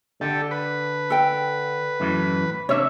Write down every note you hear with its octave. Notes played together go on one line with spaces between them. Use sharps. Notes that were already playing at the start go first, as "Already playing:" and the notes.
D3 G4 A4
B4
A4 G5
F#2 A2 E3
C3 D4 C#5 E5